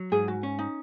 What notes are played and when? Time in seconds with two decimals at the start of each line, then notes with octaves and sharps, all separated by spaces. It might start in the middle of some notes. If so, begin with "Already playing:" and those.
Already playing: F#3
0.12 G#2 G#4
0.28 F#4
0.43 C#4
0.59 D#4